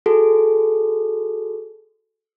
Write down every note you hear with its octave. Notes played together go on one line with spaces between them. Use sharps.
F#4 G#4 A4